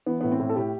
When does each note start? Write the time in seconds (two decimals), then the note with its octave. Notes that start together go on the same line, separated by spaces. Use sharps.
0.06 E3 B3
0.21 A2 B3
0.32 C4
0.40 A2
0.50 A4
0.56 A2 G4